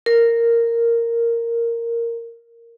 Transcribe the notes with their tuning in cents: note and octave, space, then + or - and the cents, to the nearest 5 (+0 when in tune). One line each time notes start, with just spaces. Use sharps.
A#4 -5